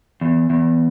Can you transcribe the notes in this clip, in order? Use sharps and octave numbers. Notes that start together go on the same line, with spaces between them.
E2
E2